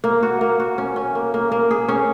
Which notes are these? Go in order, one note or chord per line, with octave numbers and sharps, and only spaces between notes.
A#3
F#4
A#3
F#4
C#4
C#4
A#3
A#3
A#3
G#4
C#4